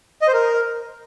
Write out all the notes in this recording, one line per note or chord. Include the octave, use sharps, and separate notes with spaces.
D#5
C5
A#4